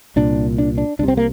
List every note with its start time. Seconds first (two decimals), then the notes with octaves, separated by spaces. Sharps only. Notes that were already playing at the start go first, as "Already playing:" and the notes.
0.16 C2 A#2 D4
0.58 D4
0.78 D4
0.99 C2 D4
1.03 C3 C4
1.17 A#3